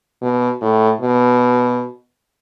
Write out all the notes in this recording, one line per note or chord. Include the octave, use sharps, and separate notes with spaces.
B2
A2
B2